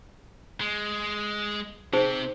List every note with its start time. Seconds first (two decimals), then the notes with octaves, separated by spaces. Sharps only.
0.61 G#3
1.93 C3 C4 D#4 G#4 C5